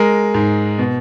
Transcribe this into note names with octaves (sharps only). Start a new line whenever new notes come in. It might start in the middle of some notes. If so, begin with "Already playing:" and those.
Already playing: G#3 A#4
G#2
B2